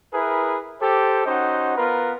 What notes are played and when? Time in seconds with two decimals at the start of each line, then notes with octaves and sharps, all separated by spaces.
0.14 E4 G#4 A#4 B4
0.81 G4 A4 C5
1.26 C#4 D#4 F#4 C5 D#5 F#5
1.77 B3 F4 A#4 B4